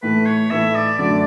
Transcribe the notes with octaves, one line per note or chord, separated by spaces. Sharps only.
A2 E3 A3 E4 B4
C#5
A2 E3 A3 E4 E5
D5
F#2 D3 A3 D4 D5